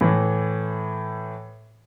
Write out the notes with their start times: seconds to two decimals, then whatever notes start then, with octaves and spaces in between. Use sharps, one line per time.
0.01 A2 E3